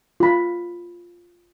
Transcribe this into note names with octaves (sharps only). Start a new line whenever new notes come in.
F4 B5